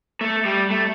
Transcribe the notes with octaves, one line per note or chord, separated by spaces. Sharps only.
A3
G3
A3